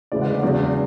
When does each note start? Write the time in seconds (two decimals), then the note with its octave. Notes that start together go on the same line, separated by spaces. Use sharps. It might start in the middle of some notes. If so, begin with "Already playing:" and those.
0.12 D2 C#3 E3 G#3 D5
0.22 F#5
0.33 D5
0.43 E1 E2 C#3 F#3 D5